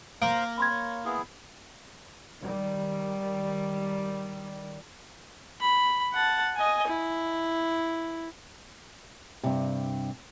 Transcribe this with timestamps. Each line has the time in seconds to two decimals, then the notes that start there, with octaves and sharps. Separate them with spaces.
0.22 A#3 C5 F5 A#5 D7
0.58 C4 A#4 B5 C6 G#6
0.71 C#5
1.05 B3 E4 G#4
2.40 D#3 G3
5.61 B5
6.13 F#5 A5
6.56 D#5 G#5
6.87 E4
9.43 G2 C3